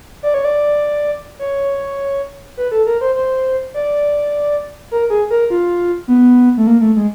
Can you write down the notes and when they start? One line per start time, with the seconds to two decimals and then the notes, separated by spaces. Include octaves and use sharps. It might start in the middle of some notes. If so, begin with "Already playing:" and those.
0.23 D5
0.34 C#5
0.45 D5
1.39 C#5
2.57 B4
2.71 A4
2.86 A#4
3.01 C5
3.15 C5
3.74 D5
4.91 A#4
5.10 G#4
5.30 A#4
5.50 F4
6.08 B3
6.57 A3
6.67 A#3
6.81 A3
6.96 G#3